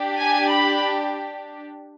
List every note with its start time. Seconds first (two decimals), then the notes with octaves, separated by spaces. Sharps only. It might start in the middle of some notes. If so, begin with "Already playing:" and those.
Already playing: D4 G4
0.18 G#5
0.49 B5